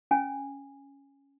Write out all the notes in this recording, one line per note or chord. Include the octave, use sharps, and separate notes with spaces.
C#4 G#5